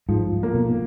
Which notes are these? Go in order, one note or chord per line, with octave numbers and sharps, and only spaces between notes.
G#2 F3
A#3
B2